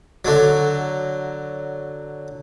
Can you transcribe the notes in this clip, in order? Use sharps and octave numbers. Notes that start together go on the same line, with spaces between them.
D3 F#3